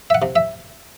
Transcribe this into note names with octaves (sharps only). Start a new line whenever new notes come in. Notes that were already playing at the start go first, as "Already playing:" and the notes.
E5
F#5
C3
E5